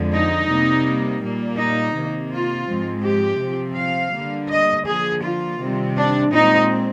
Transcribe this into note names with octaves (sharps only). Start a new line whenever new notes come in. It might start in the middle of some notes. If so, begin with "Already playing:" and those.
Already playing: F2 D3 F3 G#3
D#4
C3 G3 A#3
A#2 G3 A#3
D#4
C3 D#3 A#3
F4
G#2 F3 G#3 C4
G4
C3 F3 C4
F5
D3 G3 A#3
D#5
D3 F3 A#3 G#4
F4
C3 D#3 G3 C4
D4
A#2 G#3 C4 D#4